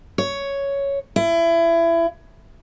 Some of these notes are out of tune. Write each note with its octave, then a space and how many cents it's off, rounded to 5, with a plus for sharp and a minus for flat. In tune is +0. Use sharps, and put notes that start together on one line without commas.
C#5 +5
E4 +25